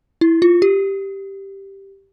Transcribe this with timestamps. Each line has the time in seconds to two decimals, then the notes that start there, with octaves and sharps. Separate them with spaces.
0.21 E4
0.42 F4
0.62 G4